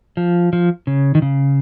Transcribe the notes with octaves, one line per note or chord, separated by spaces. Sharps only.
F3
F3
C#3
D#3
C#3